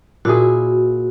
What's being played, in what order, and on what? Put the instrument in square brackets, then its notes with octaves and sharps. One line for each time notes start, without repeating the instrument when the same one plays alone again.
[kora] A#2 E4 G#4 [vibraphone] F#4